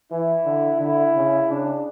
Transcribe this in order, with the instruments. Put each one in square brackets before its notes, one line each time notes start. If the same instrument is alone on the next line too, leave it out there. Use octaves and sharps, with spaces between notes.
[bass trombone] E3 [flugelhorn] E4
[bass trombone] D3
[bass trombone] D3 [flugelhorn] E4
[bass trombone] C#3
[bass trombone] C#3 [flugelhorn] D4